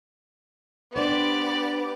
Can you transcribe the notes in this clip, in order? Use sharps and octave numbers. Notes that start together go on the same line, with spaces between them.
B3 D4 G4 C5 D5 D6